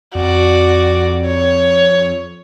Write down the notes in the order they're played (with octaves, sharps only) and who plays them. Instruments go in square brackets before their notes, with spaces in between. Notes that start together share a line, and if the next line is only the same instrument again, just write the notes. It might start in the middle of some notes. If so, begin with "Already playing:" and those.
[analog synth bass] F2 [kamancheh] F#4 D5
[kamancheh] C#5